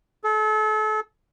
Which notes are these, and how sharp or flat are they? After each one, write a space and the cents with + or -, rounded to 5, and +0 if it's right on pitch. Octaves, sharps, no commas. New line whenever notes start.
A4 -35